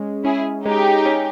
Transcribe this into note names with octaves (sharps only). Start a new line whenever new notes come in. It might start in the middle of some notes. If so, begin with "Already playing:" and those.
Already playing: G#3 C#4
C#4 E4 G#4
G#3 D#4 G4
C#4